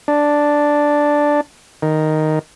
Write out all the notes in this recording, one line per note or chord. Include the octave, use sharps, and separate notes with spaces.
D4
D#3